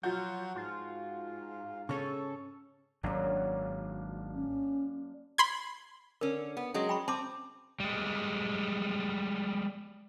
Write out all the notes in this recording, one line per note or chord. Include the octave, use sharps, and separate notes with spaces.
F3 F#3 F4 F#4 G6
G#2 F4
C#3 C#4 G#4 A4 C#6
G#1 F#2 F#3 A#3 D4
C#4
B5 C6 G#6
D3 C#4 A#4
B3
F#3 G#3 C#4
G5 B5 C#6
C4 A5 C6 D6
G3 G#3